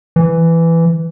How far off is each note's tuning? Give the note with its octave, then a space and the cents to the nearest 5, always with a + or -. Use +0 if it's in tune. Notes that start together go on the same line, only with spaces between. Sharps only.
E3 +10